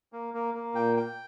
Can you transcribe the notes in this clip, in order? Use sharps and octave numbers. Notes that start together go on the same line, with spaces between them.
A#3
A#3
A#3
A#2 G5
G5